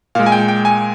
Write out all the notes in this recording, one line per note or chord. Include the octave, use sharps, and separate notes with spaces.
A#2 G#3 F5
G#5
G5
G5
G#5